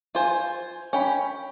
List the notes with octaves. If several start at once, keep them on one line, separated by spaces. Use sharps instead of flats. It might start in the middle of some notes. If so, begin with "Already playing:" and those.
F4 C5 G#5
C#4 G5 B5